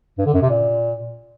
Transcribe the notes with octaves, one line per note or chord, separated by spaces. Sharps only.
G2
D3
F#2
C3
A#2